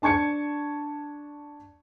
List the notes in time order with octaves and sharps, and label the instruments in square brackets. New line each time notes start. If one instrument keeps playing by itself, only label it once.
[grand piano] D4 A5 C#6 G#6 C#7